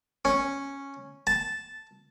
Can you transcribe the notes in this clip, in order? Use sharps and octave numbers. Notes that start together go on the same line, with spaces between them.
C#4
A5